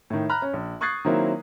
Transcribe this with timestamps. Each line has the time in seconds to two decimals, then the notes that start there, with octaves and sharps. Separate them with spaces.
0.10 A2 D#3
0.29 A#5 B5 F6 F#6
0.42 C#4
0.53 A#1
0.81 C#6 D#6 F#6 G#6 A6 C7
1.05 D#3 F#3 A#3 C4 E4